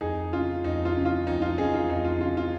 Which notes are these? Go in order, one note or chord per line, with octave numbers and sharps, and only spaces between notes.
F2 D#4 G#4
C#3 F4
F2 D#4
F4
C#3
F4
F2 D#4
F4
C#3 D#4 G#4
F4
F2 D#4
F4
C#3 F4
F4